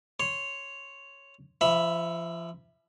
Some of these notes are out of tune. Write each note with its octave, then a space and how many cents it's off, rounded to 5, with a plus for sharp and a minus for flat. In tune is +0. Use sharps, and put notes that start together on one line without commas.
C#5 +0 C6 +0
F3 -35 E5 +0 B5 +0